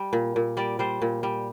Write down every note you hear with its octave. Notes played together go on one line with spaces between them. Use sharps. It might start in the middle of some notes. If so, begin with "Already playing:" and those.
Already playing: G3
A#2
A#2
G3 D5
G3 C5
A#2
G3